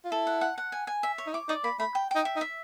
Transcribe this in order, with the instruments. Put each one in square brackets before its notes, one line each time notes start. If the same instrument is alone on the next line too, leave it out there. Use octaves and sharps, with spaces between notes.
[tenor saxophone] F4
[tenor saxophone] E4 [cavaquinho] A4
[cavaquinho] F#5
F#5
F#5
G#5
G#5
E5
C#5
[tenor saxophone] D#4
[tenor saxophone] E4 [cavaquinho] D6
[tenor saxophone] D#4 [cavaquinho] D5
[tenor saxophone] A#3 [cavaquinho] B5
[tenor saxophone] A3 [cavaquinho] B5
[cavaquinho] G5
[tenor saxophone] D#4 [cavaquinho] G5
[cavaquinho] E5
[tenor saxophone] D#4
[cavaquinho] E5